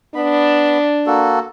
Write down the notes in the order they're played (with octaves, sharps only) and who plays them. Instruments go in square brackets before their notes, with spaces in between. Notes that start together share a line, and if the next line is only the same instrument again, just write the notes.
[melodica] B3 B5 [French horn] D4
[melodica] A#3 F#4 A4